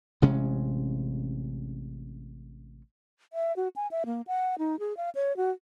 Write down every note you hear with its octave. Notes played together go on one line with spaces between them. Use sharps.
A1 C3 G#3 C#4
E5
F#4
G#5
E5
A#3
F#5
D#4
G#4
F5
C#5
F#4